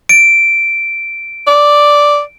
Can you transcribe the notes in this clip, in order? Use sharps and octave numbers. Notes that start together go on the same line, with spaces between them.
D7
D5